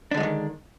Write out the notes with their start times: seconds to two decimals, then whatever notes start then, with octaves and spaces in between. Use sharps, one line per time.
0.11 D4
0.14 D3
0.17 G#3
0.20 F#3
0.23 D#3